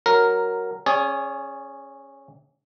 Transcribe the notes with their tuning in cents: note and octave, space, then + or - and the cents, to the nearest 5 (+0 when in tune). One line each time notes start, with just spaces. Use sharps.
F#3 +0 A#4 +0
C#4 -15 G#4 +0 D5 -40